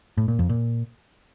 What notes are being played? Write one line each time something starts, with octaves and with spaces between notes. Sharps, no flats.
A2
A#2
F2
A#2